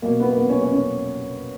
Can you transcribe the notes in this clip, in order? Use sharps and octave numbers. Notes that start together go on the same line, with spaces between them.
B2 A#3
B3
A#3
B3
C#4
C#4
C#4